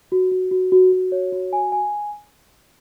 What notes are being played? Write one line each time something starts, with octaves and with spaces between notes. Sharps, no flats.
F#4
F#4
F#4
F#4
F#4
C#5
F#4
G#5
G#5